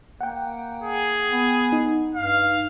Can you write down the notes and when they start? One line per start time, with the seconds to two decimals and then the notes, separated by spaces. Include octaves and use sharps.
0.21 A#3 F#5 G5
0.82 G#4
1.30 B3
1.72 D#4
2.14 G2 F5